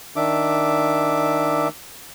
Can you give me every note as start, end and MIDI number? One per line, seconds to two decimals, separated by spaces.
0.16 1.68 51
0.16 1.68 62
0.16 1.68 76
0.16 1.68 86